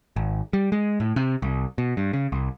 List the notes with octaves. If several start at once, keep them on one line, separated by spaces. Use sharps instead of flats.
G#1
G3
G#3
A2
C3
C2
B2
G2
C#3
C2